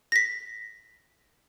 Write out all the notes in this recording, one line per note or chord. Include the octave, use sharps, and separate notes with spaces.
A#6 B6